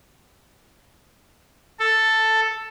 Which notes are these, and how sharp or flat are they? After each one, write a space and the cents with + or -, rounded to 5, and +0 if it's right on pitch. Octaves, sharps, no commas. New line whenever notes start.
A4 +5